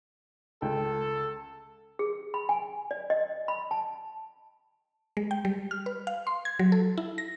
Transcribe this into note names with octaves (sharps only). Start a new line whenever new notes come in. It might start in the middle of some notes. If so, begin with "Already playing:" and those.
C#2 A4 G5
G#4
B5
G#5
D5
D#5
B5
A5
G#3
G5
G3
F6
B4
F5
C6
G#6
F#3
A4
E4
A#6